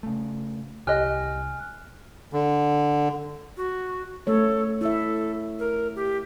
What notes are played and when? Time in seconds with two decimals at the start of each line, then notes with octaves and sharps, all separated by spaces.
0.03 C#3 A3
0.87 C2 G4 D#5 G#5 F6 F#6
2.33 D3
3.57 F#4
4.27 A3 A4 C#5
4.81 E4 A4 E5
5.59 A#4
5.95 G4